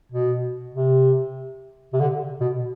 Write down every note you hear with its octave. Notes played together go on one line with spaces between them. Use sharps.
B2
C3
C3
D3
B2